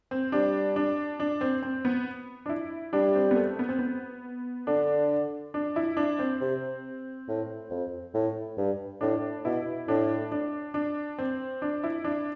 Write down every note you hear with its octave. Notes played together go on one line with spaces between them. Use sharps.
C4
G3 D4
D4
D4
C4
C4
B3
D4
E4
G3 D4
C4
B3
A3
B3
C4
B3
D3 D4
D4
E4
D4
C4
C3
A2
F2
A2
G2
A2 D4
B2 E4
A2 D4
D4
D4
C4
D4
E4
D4